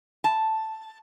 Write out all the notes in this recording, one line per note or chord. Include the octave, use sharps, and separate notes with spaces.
A5